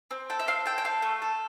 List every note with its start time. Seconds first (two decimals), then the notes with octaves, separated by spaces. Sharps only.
0.11 C4
0.30 A4 G5
0.39 E5
0.48 C4 F5
0.66 A4 G5
0.78 G5
0.85 A4 F5
1.02 A3
1.22 A4